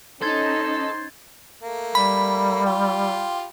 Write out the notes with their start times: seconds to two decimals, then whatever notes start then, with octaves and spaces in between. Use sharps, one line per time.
0.22 C#4 D#4 A4 C5 G#6 A6 G7
1.63 A3 A#3
1.95 G3 B5
2.66 F4 G4